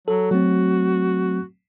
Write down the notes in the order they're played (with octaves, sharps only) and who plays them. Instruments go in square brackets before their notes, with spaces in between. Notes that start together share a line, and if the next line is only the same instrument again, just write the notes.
[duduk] F#3 [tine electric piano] A4
[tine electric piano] F#3 A3 C4 [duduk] F#4